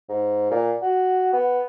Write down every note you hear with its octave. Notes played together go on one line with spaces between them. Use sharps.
G#2
A#2
F#4
B3